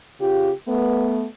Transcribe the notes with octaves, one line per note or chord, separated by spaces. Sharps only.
C#3 F4 G4
A3 B3